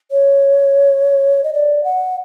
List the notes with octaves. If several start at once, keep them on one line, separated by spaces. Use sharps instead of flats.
C#5
D#5
D5
F#5